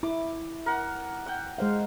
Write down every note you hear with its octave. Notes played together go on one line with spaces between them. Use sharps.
E4 D6
A#4 F#5
F#5 G5
G#3 C5 F5